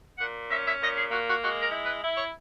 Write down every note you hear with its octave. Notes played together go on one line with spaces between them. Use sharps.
A#2 F#5
C#4 E5
E5
A#2 D#5
G#4
A#3 F#4
F#4
G#3 F#4
A#4
E4
B4
E4
C#5